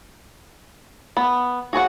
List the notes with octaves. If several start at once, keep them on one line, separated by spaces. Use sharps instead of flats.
B3
F#4 G#4 C#5 F#5